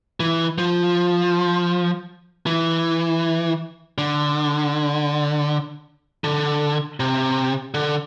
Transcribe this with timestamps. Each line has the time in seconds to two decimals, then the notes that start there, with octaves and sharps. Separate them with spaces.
0.20 E3
0.58 F3
2.46 E3
3.98 D3
6.24 D3
7.00 C3
7.74 D3